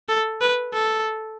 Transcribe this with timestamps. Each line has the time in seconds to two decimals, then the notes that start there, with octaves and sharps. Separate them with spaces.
0.09 A4
0.41 B4
0.73 A4